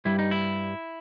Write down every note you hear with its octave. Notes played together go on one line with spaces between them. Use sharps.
G2 G3 E4
D#4
E4